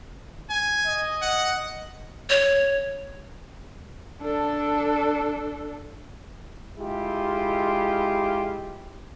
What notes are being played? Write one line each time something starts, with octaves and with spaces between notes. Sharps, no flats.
G#5
D#5
F#5
C#5
D4 A4
G#3 E4 F4 G4